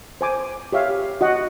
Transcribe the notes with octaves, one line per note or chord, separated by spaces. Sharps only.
C5 G#5 D6
G4 C#5 E5 F5
F#4 D#5 F#5